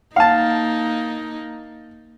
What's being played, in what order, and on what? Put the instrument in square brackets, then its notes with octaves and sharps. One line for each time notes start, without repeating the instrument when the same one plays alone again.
[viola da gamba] A#3 D#4 [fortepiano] F5 A5